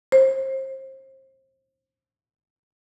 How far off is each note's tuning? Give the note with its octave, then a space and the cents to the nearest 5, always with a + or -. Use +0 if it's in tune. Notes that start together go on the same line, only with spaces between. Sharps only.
C5 +30